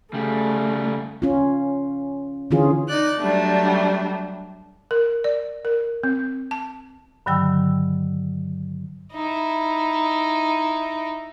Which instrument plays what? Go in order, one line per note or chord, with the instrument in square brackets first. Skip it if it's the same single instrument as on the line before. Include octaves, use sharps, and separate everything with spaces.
[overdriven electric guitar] C#3 G3 [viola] A3
[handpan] C#4 F4
D3 E3 C#4 F4 G#4
[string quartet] D#4 D5 F#6
F#3 G3 A3 D4
[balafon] A#4
D5
A#4
C4
A5
[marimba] G2 D3 D#3 F#3 G5 E6
[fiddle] D#4 E4